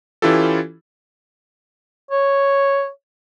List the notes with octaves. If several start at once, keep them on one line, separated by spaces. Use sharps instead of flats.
E3 C#4 E4 F4 G4 A4
C#5